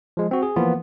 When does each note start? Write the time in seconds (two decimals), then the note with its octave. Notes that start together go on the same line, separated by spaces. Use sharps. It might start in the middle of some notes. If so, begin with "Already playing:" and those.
0.17 F3 G#3
0.31 C4 F#4
0.43 G#4
0.56 E3 F3 A#3 B3 F4